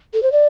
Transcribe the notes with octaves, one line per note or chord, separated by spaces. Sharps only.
A4
C5
D5